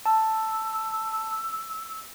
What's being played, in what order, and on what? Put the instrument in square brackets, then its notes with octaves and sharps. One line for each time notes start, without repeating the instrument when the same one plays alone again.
[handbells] A5 [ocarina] E6